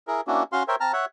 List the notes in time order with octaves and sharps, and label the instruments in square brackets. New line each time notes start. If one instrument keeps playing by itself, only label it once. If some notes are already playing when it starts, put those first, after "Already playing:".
[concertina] E4 G#4 A#4
A#3 C#4 D4 E4 F#4
C#4 F#4 F5 C6
A#4 C5 C#5 E5 G5
C4 A5 A#5 F6
C#5 E5 F#5